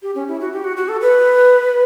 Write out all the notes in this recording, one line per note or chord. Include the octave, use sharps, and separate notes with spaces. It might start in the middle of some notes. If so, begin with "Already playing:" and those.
G4
C#4
E4
F#4
G4
F#4
F#4
A4
B4